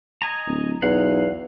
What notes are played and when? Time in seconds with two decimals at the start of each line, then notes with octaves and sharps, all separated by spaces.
0.22 D#5 G#5 A#5
0.47 D1
0.82 B1 E2 F5 F#5